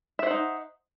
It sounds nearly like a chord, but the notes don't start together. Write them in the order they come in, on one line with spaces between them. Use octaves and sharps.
E5 C5 F#5 D#4